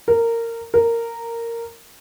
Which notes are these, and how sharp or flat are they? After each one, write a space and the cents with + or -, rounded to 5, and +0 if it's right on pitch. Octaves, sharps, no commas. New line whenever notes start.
A#4 -15
A#4 -10